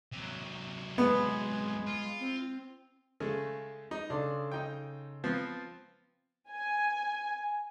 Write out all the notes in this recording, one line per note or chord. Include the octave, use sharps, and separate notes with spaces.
C3 F#3
G#3 B3
F4
C4
C#3 G#3 A3
D#4
C#3 D4 A4 C6
D#4 G5
F3 B3 C4
G#5